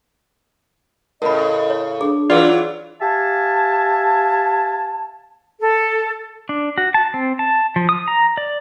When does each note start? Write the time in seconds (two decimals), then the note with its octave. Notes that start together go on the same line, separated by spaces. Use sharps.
1.22 A2 C#3 A#4 D#5 B5
1.70 C#5
2.01 D4 G#4
2.30 E3 F#3 F4 G#4 B4 D5
3.01 G4 E5 F5 G#5 A5
5.60 A4
6.49 D4
6.78 F#4
6.94 A5
7.14 C4
7.39 A5
7.76 F3
7.89 D#6
8.08 A#5
8.37 D5